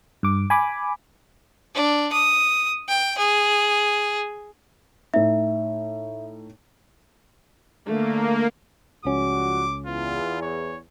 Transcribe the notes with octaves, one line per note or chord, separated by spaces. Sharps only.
G2 D6
G#5 B5 D6
D4
D#6
G5
G#4
A2 D#4 E5
D3 A3 A#3
C#2 F3 G3 C#4 F#4 D6
E2 F4
C#5